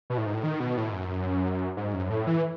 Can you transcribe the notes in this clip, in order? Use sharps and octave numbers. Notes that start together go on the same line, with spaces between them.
B2
A2
G#2
A2
D#3
B2
A2
G#2
F#2
G#2
F#2
A2
E3